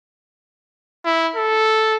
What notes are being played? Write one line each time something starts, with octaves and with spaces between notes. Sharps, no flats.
E4
A4